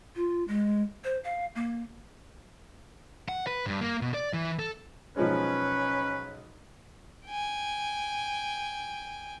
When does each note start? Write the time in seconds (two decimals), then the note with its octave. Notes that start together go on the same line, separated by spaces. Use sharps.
0.15 F4
0.48 G#3
1.04 C5
1.24 F5
1.55 A#3
3.29 F#5
3.47 B4
3.66 G2
3.81 A#3
4.01 B2
4.14 D5
4.33 E3
4.59 A4
5.17 B1 F3 G#3 C#4 B4
7.26 G5 G#5